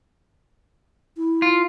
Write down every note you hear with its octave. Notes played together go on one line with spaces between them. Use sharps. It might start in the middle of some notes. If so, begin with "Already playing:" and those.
E4
F4